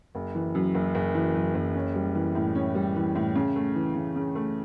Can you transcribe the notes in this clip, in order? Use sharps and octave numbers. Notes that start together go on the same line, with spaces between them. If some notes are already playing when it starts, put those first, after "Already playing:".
F#1
E3
F#2
F#1
F#1
E3
F#2
F#1
C#4
G3
E3
A2
C#4
G3
E3
A2
C#3
A3
E3
C#3
C#3
A3